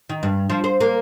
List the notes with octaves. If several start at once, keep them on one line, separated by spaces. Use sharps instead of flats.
D#3
G2
F3
C5
A#3